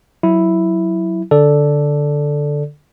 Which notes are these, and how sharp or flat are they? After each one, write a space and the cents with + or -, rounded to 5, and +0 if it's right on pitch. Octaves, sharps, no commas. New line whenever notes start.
F#3 +0 E4 +0
D3 +0 A4 +0 D5 +0